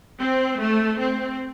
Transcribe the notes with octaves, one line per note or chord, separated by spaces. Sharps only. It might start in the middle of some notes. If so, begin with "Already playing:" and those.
C4
A3
C4